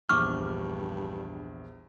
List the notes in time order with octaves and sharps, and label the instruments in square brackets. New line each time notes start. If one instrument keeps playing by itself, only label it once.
[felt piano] A#1 E2 [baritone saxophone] G2 [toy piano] C#6 D6 [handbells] F6